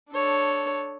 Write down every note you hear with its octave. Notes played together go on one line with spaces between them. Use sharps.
D4 A4 C#5